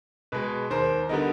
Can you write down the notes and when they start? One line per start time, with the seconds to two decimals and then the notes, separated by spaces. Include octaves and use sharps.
0.32 B2 G#3 B4
0.70 D#2 A#4 C5
1.09 D3 G3 B3 D#4 A#4